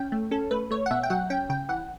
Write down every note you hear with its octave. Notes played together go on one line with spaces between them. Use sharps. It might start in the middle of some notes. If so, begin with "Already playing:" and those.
Already playing: C#4 G5
A3
C#4 A4
A3 B4
A3 C#5
F#5
B2 E5
G5
F#3 F#5
C#4 G5
C#3 G5
E3 F#5